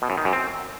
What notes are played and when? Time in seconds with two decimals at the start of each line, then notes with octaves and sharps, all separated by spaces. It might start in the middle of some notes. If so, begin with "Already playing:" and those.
0.02 B2
0.10 F#2
0.17 D#3
0.25 F#2
0.33 C4